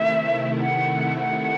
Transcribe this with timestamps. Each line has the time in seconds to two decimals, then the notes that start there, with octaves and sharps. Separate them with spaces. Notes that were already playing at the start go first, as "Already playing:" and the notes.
Already playing: C3 D#3 A3 E4 E5
0.60 F#5
1.17 F#5